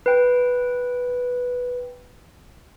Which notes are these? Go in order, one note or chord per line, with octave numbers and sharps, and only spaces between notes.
B4 G5